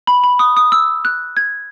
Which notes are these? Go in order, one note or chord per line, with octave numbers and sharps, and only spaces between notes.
B5
B5
D#6
D#6
E6
F#6
G#6